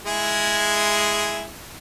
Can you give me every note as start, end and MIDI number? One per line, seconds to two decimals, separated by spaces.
0.06 1.46 56
0.06 1.46 64
0.06 1.46 68